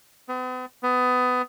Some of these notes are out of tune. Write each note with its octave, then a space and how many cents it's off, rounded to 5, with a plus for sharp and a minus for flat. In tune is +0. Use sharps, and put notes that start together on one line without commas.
B3 +45
B3 +20